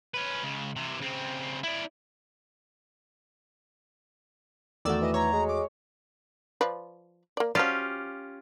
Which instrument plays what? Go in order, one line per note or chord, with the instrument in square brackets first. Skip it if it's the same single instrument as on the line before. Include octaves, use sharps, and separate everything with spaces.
[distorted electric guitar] C#4 B4
C#2 C#3
C3 E3
C#3 C4
E4 D5
[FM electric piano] E2 A3 F#4 [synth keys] D#3 D5 E6
[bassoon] E3 [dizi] D#5
[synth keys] C#5 [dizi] A#5
[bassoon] G#3
[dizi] D6
[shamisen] F3 B4 D5
A#3 D5
[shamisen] F3 F#3 D5 [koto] C#4 F4 G4